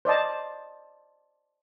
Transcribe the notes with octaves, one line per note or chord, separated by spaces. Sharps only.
C5 D5 D#5 A5